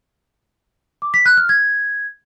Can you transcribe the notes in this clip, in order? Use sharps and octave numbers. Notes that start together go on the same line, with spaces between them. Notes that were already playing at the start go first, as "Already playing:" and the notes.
D6
B6
F#6
F6
G#6